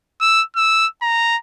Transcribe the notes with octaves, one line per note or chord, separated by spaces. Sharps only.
E6
E6
A#5